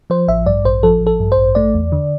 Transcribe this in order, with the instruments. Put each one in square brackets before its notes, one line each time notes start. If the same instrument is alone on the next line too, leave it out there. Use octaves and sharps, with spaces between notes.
[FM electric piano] F3 C5
A1 E5
G2 D5
A1 C5
F3 A4
A1
A4
G2
C5
A1
A3 D5
E2
D3